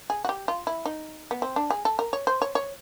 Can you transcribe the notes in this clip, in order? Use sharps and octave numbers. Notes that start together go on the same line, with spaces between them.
G#4
F#4
G4
F4
E4
D#4
B3
C4
D4
G#4
A4
A#4
C#5
C5
C#5
C#5